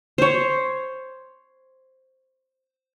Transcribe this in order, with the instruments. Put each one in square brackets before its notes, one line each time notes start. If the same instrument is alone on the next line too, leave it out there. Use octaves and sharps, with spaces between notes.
[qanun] C5 C#5